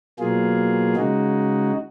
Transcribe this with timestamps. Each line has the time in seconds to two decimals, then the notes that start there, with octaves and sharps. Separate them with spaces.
0.19 B2 F#3 A#3 F4 G#4
0.96 C#3 G#3 D#4 F#4